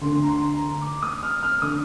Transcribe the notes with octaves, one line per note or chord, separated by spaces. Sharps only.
D2 D3 C6
A#5
C6
A#5
D6
D#6
F6
F6
D3 D#6